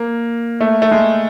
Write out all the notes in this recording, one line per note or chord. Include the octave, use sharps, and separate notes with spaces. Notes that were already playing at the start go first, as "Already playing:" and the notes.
Already playing: A#3
A3
A3
G#3